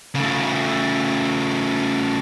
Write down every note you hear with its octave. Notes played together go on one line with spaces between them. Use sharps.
C#3 A3